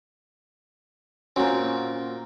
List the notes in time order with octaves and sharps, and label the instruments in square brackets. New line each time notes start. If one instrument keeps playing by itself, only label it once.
[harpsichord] A#2 C4 [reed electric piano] C#4 F#4